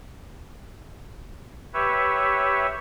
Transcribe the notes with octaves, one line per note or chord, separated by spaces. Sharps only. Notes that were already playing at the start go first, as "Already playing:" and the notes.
G4 B4 C#5 E5